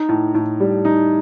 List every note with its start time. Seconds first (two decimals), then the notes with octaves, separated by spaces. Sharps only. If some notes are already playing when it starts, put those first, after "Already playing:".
Already playing: D#4
0.09 A2
0.34 A2
0.60 G3
0.85 D#4